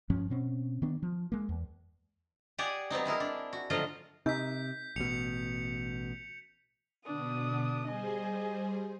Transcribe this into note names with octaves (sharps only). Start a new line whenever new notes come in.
G2 F3 C#4
B2 C4 C#4
D#3 B3 D4
F3
G#3 A#3
E2
G4 G#4 D5 F#5 G#5
F#3 B3 C4 D#4
G#3 E4 G#4 A#4
D4
F#4
A2 D3 F3 F#3 F4 D#5
C3 D#4 G6 B6
A1 B2 C#7 F7
B2 D3 B3 D4 D#6
G3 G#4 C5 D#5 G#5